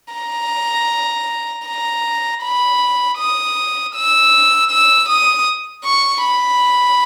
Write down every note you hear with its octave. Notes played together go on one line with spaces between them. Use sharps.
A#5
A#5
B5
D#6
E6
E6
D#6
C#6
B5